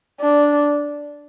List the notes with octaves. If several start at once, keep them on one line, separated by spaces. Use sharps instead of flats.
D4